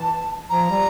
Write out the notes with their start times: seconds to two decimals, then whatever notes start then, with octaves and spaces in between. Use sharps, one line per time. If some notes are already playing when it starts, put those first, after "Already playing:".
Already playing: E3 A5
0.49 F3 A#5
0.70 G3